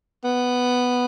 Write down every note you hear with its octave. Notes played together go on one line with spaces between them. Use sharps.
B3